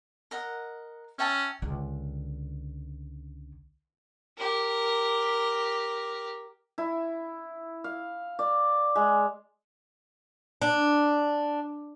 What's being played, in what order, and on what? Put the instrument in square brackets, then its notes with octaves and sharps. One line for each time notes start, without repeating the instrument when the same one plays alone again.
[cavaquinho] A#4 D#5 F#5
[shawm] C#4 [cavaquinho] E5 G5 A5
[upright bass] C#2 D3
[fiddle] G4 A#4
[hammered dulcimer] E4
F5
D5
G#3
[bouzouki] D4